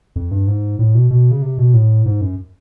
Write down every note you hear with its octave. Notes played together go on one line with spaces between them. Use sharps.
F2
G2
G#2
A2
B2
B2
C#3
C3
B2
A2
G#2
F#2